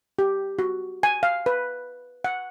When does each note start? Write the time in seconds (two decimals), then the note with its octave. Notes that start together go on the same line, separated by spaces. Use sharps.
0.19 G4
0.59 F#4
1.03 G#5
1.23 F5
1.46 B4
2.24 F#5